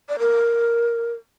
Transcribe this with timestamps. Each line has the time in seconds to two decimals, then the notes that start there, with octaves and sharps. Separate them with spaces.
0.09 D5
0.19 A#4